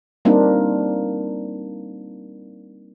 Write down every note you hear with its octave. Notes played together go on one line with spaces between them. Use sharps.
G3 A#3 C4 D4 D#4 F4